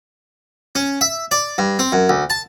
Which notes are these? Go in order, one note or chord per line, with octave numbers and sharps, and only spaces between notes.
C#4
E5
D5
G2
C4
F#2
D2
A5